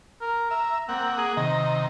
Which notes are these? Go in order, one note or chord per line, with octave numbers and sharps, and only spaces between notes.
A#4
E5 A#5
A#3 C4 F#5
G#4
C3 D#3 D#5 A#5